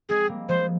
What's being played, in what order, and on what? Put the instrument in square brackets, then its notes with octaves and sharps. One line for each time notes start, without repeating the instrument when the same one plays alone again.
[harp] G#3 C4 [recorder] G#4
[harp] G3 A#3
[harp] F3 G#3 [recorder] C5